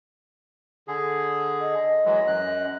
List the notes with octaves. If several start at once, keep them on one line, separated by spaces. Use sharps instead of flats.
D3 G#4
D#5
E3 F#3 G#3
F#2 F#6